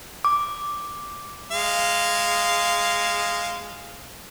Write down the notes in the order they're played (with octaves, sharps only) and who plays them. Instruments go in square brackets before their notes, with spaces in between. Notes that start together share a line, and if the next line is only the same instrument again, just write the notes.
[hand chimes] D6
[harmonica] G#3 F5